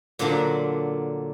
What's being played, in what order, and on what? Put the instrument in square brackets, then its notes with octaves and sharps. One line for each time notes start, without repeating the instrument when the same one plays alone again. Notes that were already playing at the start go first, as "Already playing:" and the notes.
[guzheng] A#2 D3 F#3 A#3 D4